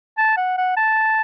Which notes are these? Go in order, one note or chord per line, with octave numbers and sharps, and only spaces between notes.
A5
F#5
F#5
A5